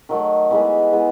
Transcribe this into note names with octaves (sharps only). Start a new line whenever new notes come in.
D#3 F#3 A3
E3 G#3 B3
E3 G#3 B3